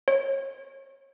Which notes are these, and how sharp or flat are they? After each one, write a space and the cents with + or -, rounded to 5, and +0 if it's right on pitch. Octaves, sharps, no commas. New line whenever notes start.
C#5 -30